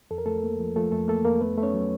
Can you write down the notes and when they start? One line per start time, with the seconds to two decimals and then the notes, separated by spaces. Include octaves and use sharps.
0.11 F2 A4
0.18 A#4
0.26 F2 A3 A4
0.43 A#3
0.59 F3
0.76 F3 A3 A4
0.92 F2 A3 A4
1.08 A3 A#3 A4
1.25 F2 A#3 A#4
1.41 A3 B3 B4
1.58 A3
1.63 C#4 C#5
1.74 F#3